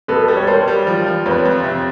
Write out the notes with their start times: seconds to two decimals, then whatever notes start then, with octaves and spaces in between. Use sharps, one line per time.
0.08 B2 A4 B4
0.28 G3
0.36 C#5
0.47 G3 A#4 C5
0.68 G3
0.87 F3
1.07 F3
1.26 F2 B4 C#5
1.45 F2
1.64 C3